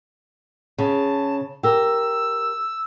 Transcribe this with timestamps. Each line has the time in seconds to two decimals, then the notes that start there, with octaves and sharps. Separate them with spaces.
0.78 C#3 A5
1.63 G4 A#4 E6